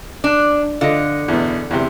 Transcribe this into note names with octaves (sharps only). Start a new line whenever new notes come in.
D4
D3 F4 D#5
E2 B2
E2 C3